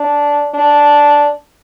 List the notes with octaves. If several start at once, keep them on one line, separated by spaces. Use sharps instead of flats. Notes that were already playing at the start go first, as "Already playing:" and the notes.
Already playing: D4
D4